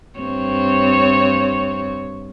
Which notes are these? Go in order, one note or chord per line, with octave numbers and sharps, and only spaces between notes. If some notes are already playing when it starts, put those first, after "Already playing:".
G2 C4 C#5